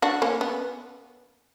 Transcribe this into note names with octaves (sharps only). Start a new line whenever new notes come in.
D4 F#4
A#3 C#4
B3